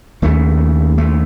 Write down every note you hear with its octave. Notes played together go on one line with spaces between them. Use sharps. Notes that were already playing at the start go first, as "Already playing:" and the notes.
D#2 C#3 A3
A3